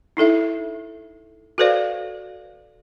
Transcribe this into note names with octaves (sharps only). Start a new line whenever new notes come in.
D#4 E4 A4 E5
F#4 A4 B4 C5 D5 F5